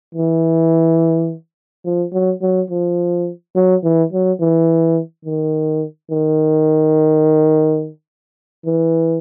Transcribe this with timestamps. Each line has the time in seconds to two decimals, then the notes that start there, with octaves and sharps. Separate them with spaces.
0.15 E3
1.85 F3
2.13 F#3
2.42 F#3
2.70 F3
3.56 F#3
3.84 E3
4.13 F#3
4.41 E3
5.25 D#3
6.11 D#3
8.65 E3